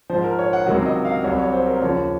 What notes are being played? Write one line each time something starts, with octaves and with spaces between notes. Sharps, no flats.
G#2 F3 C5
A#4
C#5
F#5
C#2 C3 D#3 F#3
D#5
F5
C2 C3 F#3 C#5
C#5
C5
A#4
D#2 C#3 F3 C#5